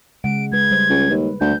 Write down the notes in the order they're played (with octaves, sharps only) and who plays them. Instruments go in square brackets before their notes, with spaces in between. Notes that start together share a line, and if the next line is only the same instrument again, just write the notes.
[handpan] C#3 G#3 F#5 [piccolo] D7
[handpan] G#3 B4 [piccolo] G#6
[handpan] G3 C5
[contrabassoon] C#2
[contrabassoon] D#2 [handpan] B4
[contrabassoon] D2 [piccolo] G6